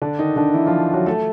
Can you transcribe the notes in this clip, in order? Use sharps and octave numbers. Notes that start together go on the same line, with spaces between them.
D3 D4
D#3 D#4
D3 D4
E3 E4
F3 F4
F#3 F#4
A3 A4